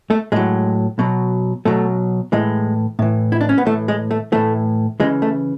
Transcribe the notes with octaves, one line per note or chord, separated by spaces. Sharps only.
A3
A2 F#3 G#3
B2 F#3
B2 F#3 A3
A2 E3 G#3
A2 E3
E4
D4
C#4
B3
A2 E3 A3
G#3
A3
A2 E3 A3
C#3 E3 G#3
A3